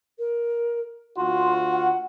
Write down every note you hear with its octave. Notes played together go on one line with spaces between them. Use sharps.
A#4
D2 F4 F#4 C6
F#5